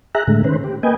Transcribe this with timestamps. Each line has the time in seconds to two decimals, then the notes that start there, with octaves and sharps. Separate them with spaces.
0.15 G#4 E5 A#5 F#6
0.27 A2 D3 G#3 A3
0.44 D#3 C#4 B4 C5
0.64 G4
0.83 A#3 B4 D#5 G5 G#5